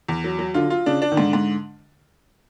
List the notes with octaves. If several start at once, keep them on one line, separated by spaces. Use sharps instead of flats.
E2
F#3
F#3
D3 F4
F4
C#3 D4
D4
D#3
G#2 D3
G#2